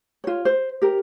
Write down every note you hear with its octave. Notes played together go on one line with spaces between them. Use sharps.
F4 C#5
C5
G4 A#4